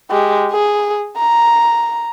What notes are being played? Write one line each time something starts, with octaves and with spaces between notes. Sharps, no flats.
G#3 G4
G#4
A#5